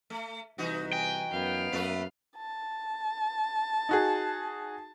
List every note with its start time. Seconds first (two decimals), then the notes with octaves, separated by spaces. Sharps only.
0.10 A3
0.58 C2 E3 D#4 F#4
0.93 G5 G#5
1.31 F#2 B3 F5
1.72 F#2 A3 A#3 B4
2.37 A5
3.89 D#4 F#4 G#4